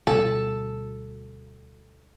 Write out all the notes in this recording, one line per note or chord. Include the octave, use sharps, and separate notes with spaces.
D2 B2 G3 A4